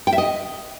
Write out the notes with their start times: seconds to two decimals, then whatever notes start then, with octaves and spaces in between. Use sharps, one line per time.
0.07 G5
0.13 E5
0.18 D#5